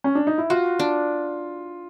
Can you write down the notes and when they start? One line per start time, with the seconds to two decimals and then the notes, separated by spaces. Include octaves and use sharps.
0.04 C#4
0.15 D4
0.27 D#4
0.38 E4
0.50 F4 F#4
0.79 D4